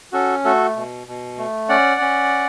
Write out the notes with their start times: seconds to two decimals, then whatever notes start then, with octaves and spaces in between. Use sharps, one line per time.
0.12 C#4 F#4 A4
0.45 A3 F#4 A4
0.76 B2
1.07 B2
1.38 A3
1.69 C#4 D5 F#5
2.01 C#4